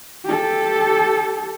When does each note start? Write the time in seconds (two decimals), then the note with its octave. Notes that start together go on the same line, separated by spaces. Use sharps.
0.25 G4 A4